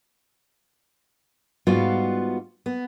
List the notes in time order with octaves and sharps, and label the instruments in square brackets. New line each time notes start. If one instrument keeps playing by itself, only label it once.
[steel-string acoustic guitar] G#2 G3 B3 F4 F#4 F5
B3